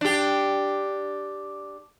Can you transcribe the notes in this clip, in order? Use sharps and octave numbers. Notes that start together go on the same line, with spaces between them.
D4 G4